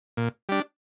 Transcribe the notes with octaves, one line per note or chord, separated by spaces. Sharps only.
A#2
G3 D4